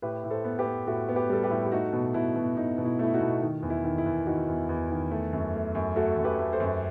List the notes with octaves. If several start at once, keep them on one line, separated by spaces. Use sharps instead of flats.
A2 G4 B4
A2
A4 C5
B3
G4 B4
B3
A2 F#4 A4
B3
G4 B4
G3 A4
G4 B4
A2
G4
A3 D#4 F#4
B2
B2 E4
B2
B2 D#4
B2
E4
A3 E4
D#4 F#4
B2
D#3
E2
E4
D#3
E4
E2
D#3 D#4 F#4
E2
E2
D#3
A3
F#2
A3
F#2
A3 F#4 A4
F#2
G4 B4
A3
A4 C5
F#2